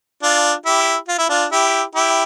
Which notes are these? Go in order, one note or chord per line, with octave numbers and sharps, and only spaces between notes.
D4 F4
E4 G4
F4
E4
D4 F4
E4 G4
E4 G4